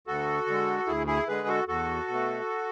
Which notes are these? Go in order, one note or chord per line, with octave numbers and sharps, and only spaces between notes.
D2 F#4 A4
D3 G#3
D2 E4 G#4
E4 G#4
D3 G#3 G#4 B4
F#4 A4
E2 F#4 A4
B2
A3